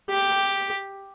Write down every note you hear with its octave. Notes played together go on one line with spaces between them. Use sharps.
G4